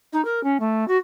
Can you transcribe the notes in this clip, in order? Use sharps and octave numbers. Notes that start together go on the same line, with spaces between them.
D#4
A#4
C#4
A3
F#4